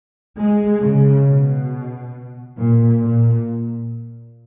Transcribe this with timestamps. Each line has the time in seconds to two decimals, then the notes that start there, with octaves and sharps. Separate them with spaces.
0.38 G#3
0.82 C#3
1.26 B2
2.57 A#2
3.01 A#2